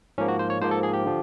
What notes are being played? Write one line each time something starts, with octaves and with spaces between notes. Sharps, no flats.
G#2 F3 A#3 C#4
F#4
C5
C#5
G#2 F3 A#3 C5
A4
G#4
G4
D3 F3